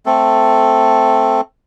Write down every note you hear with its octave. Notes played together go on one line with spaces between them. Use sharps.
A3 C4 A4